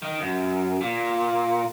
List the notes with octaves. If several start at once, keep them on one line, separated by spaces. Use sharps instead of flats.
D#3
F#2
A#2